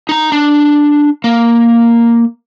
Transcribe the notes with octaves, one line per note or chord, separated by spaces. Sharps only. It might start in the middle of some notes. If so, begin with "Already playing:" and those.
D#4 A#5
D4
A#3